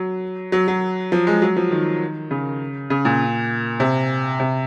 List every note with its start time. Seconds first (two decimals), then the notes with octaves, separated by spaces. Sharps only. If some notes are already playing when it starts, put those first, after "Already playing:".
Already playing: F#3
0.52 F#3
0.68 F#3
1.12 F3
1.27 G#3
1.42 F#3
1.56 F3
1.71 D#3
2.31 C#3
2.90 C#3
3.05 A#2
3.80 C3
4.40 C3